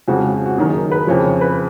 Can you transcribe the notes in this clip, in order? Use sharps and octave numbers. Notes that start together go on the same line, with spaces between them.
F2 C#3 F3 G#3 F#4
F#4
F#4
F#1 F#2 D#3 A#3 G#4
B4
F2 C#3 F3 C#5
C#5
B4